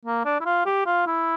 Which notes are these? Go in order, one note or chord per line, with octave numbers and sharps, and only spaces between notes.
A#3
D4
E4
F4
G4
F4
E4